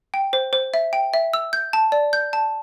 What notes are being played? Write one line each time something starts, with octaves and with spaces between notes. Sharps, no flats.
G5
C5
C5
E5
G5
E5
E6
G6
A5
D5
G6
A5